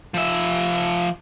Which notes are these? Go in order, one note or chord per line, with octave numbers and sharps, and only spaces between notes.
F3 E5